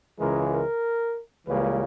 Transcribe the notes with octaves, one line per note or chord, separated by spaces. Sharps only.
C#2 C#3 E3 G#3 A#4
A#4
C#2 C#3 E3 G3 A#3 B4